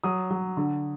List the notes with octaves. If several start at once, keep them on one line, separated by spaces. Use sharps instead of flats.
F#3 D#6
F#3
D3